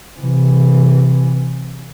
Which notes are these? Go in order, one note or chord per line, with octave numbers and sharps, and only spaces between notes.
C3 E3